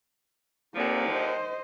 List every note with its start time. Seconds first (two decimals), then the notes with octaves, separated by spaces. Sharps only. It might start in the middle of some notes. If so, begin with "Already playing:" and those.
0.74 D#2 D3 F3 A#3 C4
1.09 C5 D#5